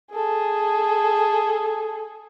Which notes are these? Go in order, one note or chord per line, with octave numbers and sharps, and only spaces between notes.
G#4 A4